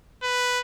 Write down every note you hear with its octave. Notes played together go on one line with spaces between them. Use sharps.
B4